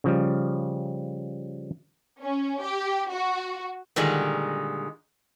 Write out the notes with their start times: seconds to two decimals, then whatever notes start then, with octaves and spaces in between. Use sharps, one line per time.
0.04 C#3 F3 G3
2.22 C#4
2.63 G4
3.09 F#4
3.96 A#2 D3 D#3 G3 G#3